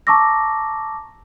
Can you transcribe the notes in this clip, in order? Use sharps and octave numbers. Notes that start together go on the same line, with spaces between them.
A5 A#5 C#6 D6 E6 A#6